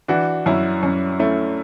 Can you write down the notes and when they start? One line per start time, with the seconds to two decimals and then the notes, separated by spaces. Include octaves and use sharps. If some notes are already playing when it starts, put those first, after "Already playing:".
0.08 E3 D4 F#4
0.46 F#2 C#4 E4
0.83 F#2 C#4
1.19 A3 C#4 E4